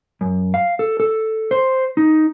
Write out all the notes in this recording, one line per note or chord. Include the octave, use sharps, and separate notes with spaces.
F#2
F5
A4
A4
C5
D#4